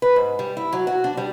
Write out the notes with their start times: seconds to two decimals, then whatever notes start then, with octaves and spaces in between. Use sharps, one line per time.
0.02 B4
0.16 G#2
0.39 G3
0.57 E4
0.73 F#3
0.87 F#4
1.04 D4
1.17 G3